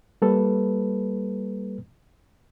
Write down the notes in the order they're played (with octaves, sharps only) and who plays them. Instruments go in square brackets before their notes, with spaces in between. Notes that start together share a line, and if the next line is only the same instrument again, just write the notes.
[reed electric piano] G3 A#3 A4 B4